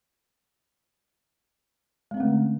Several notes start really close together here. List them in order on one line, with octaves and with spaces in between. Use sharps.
G#3 C4 C#4 A3 D3